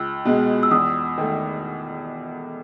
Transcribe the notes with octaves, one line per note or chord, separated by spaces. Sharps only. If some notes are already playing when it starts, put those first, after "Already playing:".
Already playing: C#2 E6
B2 G#3
E6
E2 D#6
D#3 A3